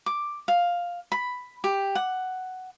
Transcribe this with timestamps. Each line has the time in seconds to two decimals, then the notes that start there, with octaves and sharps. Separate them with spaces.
0.06 D6
0.48 F5
1.12 B5
1.64 G4
1.95 F#5